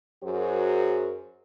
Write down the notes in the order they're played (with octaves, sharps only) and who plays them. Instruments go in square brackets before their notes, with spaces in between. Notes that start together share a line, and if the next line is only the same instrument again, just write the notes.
[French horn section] F#2 F#3 F#4 G#4 A#4 C5